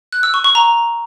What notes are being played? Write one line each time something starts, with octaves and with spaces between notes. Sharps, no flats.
F#6
E6
C#6
C#6
A#5